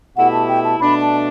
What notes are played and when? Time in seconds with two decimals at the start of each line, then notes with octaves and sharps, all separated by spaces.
0.16 B2 A3 E4 G4 F#5
0.32 A5
0.48 G5
0.64 A5
0.79 B2 A3 D4 B5
1.01 A5